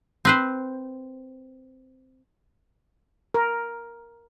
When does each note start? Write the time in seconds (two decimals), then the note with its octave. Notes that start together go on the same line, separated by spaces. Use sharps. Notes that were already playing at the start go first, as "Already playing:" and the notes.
0.25 C4 B4 C5
3.34 A#4